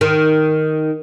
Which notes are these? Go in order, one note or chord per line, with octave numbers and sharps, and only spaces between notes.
D#3